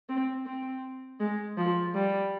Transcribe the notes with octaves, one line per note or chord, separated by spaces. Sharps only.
C4
C4
G#3
F3
G3